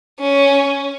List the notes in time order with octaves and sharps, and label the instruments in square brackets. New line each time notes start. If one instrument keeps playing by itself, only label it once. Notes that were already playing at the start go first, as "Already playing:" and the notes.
[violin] C#4